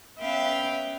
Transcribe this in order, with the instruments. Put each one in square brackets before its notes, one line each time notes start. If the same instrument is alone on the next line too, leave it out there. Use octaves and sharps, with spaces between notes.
[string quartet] B3 C#4 B4 E5 F5 G5